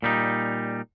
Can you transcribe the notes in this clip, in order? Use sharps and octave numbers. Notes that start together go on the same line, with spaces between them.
A#2 G3 D#4